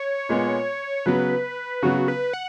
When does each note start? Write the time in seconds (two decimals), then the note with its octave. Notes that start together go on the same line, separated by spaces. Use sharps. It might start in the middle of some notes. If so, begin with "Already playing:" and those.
Already playing: C#5
0.29 A#2 G#3 B3
1.06 C#3 F#3 B3 B4
1.82 C#3 F#3 B3 F#4
2.08 B4
2.33 F#5